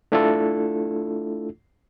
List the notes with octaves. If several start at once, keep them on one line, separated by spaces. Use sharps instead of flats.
A3 D4 E4 F4 A4